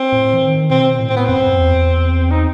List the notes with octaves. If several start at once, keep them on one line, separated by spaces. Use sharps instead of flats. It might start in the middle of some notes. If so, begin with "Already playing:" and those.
Already playing: C4
A2
E3
D#3
B2 C4
A2
C4
B3
F#2 C4
F#2
E2
D#4